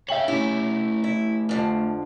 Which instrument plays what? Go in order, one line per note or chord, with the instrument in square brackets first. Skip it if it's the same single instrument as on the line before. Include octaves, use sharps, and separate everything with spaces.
[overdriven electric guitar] C#5 F5 [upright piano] E5 G5 F#7
[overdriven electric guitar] A3 G4 [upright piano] C#4 [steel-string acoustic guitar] E4
[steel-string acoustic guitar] E4
F2 D3 F3